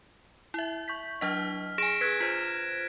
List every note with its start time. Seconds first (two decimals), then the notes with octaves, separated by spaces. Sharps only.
0.54 E4 E5
0.88 C#6 G6 B6
1.21 F#3 D4 D#5 F6 B6
1.78 G#4 G#5 A#6 D7 E7
2.01 G#4 B4 F#6 G#6 B6
2.20 F4 C5 B6